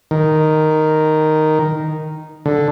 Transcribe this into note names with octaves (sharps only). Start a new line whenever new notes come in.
D#3
D3